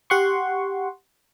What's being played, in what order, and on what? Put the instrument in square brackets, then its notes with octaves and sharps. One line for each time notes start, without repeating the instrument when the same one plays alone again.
[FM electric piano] G4 F#5 C6 C#6